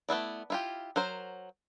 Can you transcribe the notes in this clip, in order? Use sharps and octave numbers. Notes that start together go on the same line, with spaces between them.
A3 B3 E4 D5
E4 F4 G4
F#3 A#4 C5